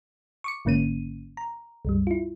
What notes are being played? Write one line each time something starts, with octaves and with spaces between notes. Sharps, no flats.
C#6 D6 C#7
G#1 G#2 D3 A#3 C#4 D#7
A#5
C2 F#2 G3
E4 F4